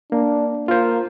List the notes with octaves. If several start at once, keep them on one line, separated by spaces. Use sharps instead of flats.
A#3 D4
A#3 F4 C5